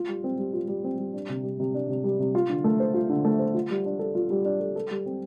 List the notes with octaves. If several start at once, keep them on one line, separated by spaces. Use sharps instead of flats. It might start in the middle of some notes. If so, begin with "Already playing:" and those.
Already playing: F4
G3
C4
G3
F4
G3
C4
G3
D4
C3
G3
C3
D4
C3
G3
C3
F4
D3
A3
C5
F4
D3
A3
C5
F4
G3
D4
A4
F4
G3
D4
A4
A4
G3
C4